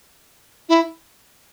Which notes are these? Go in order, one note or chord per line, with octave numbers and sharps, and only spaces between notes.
E4